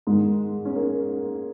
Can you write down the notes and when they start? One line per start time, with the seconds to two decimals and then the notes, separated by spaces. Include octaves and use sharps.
0.07 G#2 D#3 G#3
0.65 C#4
0.76 A#3